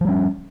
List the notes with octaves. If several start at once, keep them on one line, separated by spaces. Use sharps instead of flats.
F3 G3 C#4